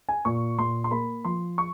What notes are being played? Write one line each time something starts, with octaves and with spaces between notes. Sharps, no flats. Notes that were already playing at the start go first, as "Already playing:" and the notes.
G#5
A#2 C#6
A#2 C6
C6
A#3 B5
F3 C6
C#6